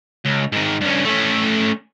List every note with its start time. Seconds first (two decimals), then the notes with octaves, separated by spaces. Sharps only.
0.25 C#2
0.52 G#2 D#3
0.81 G2 C#4
1.05 A3 C#4